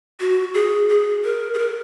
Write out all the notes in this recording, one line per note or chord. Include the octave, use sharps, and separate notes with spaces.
F#4
G#4
G#4
A#4
G#4
A#4